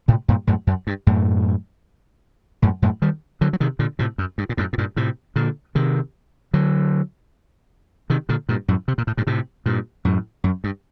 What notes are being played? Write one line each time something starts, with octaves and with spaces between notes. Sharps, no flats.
A2 C3
G2 A#2
F#2 A2
F#2
G2
F#2 A2
F#2 A2
F#2 A2
D#3 G3
D3 F#3
F#3
C3 D#3
A#2 D3
A2 C3
F#2
G2
A#2
F#2 A2
A2
G2 A#2
A2 C3
A#2 D3
C3 D#3
D3 F#3
C3 D#3
A#2 D3
G2 A#2
F#2 A2
C3
A#2
A2
G2 A#2
A2 C3
G2 A#2
F#2 A2
F#2
G2